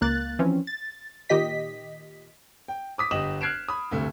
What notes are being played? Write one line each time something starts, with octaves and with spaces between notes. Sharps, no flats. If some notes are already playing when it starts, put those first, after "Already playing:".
C#2 A#3 F#6 A6
E3 F3 C4 C#4
A6
A#2 D#3 G4 D#5 B6
G5
D6 D#6 B6
G1 G4 D#5 D#6 E7 F#7
F6 F#6 G#6 C7 D7 E7
B5 D#6
D2 G2 C3 A3